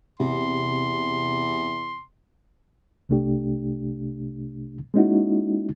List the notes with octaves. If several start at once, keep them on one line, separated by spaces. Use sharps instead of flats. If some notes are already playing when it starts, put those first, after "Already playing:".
E2 C3 C6
C2 C3 A3 D4 G4
G#3 A#3 C#4 D#4 E4 F#4